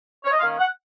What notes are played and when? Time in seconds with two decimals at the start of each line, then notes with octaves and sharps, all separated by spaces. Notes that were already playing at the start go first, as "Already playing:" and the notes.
0.24 C#5
0.32 D#5
0.40 D#3 A#3 C#4 F5
0.59 F#5